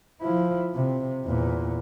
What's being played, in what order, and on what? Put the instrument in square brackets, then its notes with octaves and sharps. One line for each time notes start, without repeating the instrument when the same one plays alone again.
[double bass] F3 E4
C3
E2 A#2